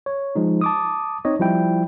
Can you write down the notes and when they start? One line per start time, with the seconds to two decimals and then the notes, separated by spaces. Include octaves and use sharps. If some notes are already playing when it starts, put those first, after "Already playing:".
0.06 C#5
0.35 F3 G#3 D#4
0.61 A5 D6 D#6
1.25 C4 D#4 C#5 D#5
1.39 F3 G3 E4 G5